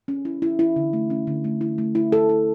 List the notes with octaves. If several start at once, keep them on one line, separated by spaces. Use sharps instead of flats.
C#4
E4
E4
E4
D3
A3
C#4
D3
A3
E4
A3
E4
A4
E4